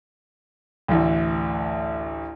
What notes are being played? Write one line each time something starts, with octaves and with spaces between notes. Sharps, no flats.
A1 D2